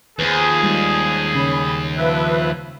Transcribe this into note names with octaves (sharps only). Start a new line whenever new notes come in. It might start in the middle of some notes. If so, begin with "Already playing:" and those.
D#2 F3 G#4 B4 C5
G3 G#3 D#4
C#3 C#4 B5
F3 B4 E5